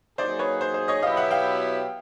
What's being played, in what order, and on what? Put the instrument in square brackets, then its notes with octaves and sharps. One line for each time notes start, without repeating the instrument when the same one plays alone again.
[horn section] F#3 A#3 D#4 G#4 [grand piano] C5 D5
[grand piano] B4 C#5
C5
C5
C#5 D#5
[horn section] B2 F#3 B3 E4 G4 [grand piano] D#5 F5
[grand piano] E5 F#5
F5 G5